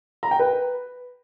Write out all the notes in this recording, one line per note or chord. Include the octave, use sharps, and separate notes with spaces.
A#5
G5
B4